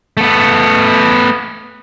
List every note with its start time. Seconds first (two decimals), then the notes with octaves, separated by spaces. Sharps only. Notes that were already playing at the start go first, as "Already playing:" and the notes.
0.17 A3 B3